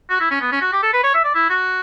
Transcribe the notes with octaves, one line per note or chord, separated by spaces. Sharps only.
F#4
E4
C#4
B3
C#4
F#4
G4
A4
B4
C#5
E5
D5
E4
F#4